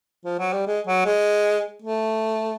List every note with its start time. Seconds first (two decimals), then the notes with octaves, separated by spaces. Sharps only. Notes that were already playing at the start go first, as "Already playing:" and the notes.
0.25 F3
0.39 F#3
0.53 G3
0.67 G#3
0.87 F#3
1.05 G#3
1.82 A3